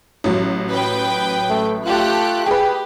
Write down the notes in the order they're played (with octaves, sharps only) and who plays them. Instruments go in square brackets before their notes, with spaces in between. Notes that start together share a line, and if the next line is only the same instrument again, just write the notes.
[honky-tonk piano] A1 F#3
[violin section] B4 G5
[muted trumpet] A3
[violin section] A3 G4 F#6 [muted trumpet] F4
[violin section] G4 [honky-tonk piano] G#4 B4 [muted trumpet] G5